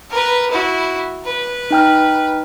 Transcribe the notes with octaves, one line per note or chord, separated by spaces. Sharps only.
A#4 B4
E4 F#4
B4
D#4 G5 F6